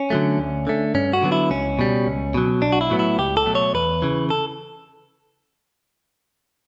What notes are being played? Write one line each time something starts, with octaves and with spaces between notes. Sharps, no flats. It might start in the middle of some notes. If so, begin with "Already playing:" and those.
Already playing: C#4
D3 F#3 A3
D2
D3 A3
G2 C#4
F#4
D3 F#3 B3
E4
C#2 C#4
B2 G3
C#2
B2 F#3
B1 D4
F#4
E4
A2 F#3 B3
E4
C#2 G4
A4
B2 F#3 A3
C#5
E2 B4
C#3 E3
A4